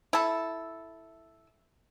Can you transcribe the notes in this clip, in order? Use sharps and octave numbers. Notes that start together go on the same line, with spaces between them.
E4 A4